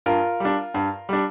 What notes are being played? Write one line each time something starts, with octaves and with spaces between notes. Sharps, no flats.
G2 F4 A#4
G3 D4
G2
G3 D4